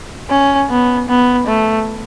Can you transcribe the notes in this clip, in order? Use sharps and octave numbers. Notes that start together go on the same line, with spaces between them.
C#4
B3
B3
A3